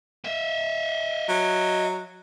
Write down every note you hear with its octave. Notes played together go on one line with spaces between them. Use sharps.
D#5 E5
F#3